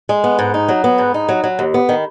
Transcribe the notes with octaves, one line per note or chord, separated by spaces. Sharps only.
G#3
B3
G#2
D#4
F#3
B3
G#2
D#4
F#3
F#3
D#2
B3
D#3